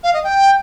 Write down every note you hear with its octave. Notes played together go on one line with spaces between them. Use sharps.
F5
D#5
G5